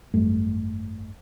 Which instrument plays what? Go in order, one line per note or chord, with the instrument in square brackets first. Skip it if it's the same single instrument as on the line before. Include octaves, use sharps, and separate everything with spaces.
[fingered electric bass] G#1 F#2 G3 A3